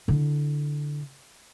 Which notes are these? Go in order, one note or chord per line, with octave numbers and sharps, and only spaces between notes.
D3 E4